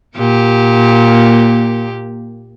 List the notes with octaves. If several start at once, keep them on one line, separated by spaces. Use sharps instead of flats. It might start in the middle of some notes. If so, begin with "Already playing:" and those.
A#2 A#3 G4